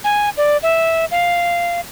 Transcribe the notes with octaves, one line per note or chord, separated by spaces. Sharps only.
G#5
D5
E5
F5